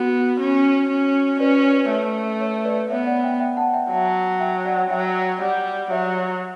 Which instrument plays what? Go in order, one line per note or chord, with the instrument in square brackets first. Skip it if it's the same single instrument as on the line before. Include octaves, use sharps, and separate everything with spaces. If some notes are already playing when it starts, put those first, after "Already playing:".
Already playing: [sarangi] B3 [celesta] F#4
[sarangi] C#4
C#4
[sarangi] C#4 [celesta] B4 D5
[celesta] C#5
B4
[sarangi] A3 [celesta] B4
[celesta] C#5
B4 D5
[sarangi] B3 [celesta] C#5 E5
[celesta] D5 F#5
E5 G5
E5 G5
F#5 A5
E5 G5
[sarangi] F#3 [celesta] F#5 A5
[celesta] E5 G5
D5 F#5
[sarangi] F#3 [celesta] E5 G5
[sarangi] G3 [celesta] D5 F#5
[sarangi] F#3 [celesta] C#5 E5